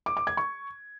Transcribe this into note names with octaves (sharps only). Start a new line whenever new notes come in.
D6
D6
G#6
C#6